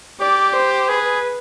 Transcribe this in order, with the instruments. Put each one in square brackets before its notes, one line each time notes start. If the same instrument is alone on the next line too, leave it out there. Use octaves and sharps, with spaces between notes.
[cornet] G4 [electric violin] D5
[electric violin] C5
[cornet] G#4 [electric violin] B4